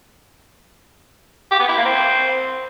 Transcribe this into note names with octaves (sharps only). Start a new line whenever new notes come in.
G4
B3
E4
A#3
C4